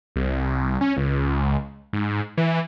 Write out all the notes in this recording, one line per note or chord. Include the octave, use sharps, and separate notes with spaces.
C2
C#4
C#2
G#2
E3